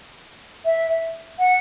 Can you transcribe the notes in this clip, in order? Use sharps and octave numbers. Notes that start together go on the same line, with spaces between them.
E5
F#5